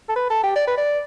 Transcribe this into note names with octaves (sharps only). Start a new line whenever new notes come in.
A4
B4
A4
G4
D5
B4
D5